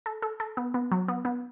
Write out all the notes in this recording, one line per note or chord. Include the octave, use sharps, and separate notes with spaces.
A4
A4
A4
B3
B3
F#3
B3
B3